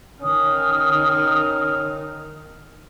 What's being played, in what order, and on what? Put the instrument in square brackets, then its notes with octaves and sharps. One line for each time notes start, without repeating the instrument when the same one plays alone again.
[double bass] D#3 [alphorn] C#4 [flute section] D#6 [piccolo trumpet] F6